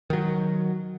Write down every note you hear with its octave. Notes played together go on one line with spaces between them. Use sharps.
D#3 F#3